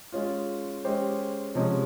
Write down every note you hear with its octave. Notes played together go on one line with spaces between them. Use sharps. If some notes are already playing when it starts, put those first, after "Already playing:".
G#3 C#4 F4
G#3 C#4 G4 C5
C3 F3 G#3 C#4